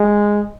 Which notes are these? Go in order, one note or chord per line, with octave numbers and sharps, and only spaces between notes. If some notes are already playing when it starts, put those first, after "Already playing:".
Already playing: G#3